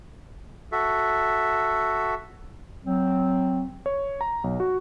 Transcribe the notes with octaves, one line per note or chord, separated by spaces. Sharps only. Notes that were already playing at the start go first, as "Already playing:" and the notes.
F#4 A4 E5
F#3 C4
C#5
A#5
B1
F#4